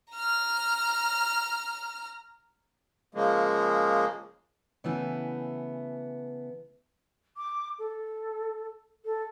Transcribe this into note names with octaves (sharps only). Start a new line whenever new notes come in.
A#5 F6
C#3 F3 G#3 A#3
C#3 E3 A3 B3 E4 G#5
D6
A4
A4